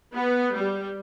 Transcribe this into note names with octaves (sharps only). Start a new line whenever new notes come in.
B3
G3